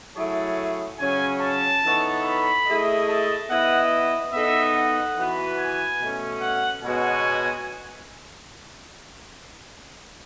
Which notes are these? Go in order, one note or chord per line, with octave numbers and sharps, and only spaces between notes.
F#3 A3 E4 G#4 C#5 A5
C#3 F#3 C#4 G#5
A5
E3 B3 D#4 A4 C#5
B5
A3 E4 G#4 D#5
A5
B3 E4 B4 D#5 F#5
B3 D#4 A4 D#5 E5
F#5
E3 B3 F#4 B4
G#5
B2 A3 C#4
F#5
B2 G#3 B3 F#4 C#5 G#5